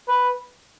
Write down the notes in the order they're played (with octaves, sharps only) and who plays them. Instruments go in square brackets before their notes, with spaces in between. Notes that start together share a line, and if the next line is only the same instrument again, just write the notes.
[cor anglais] B4